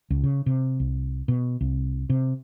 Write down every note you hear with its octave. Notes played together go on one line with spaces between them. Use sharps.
C#2
C#3
C3
C2
B2
C2
C3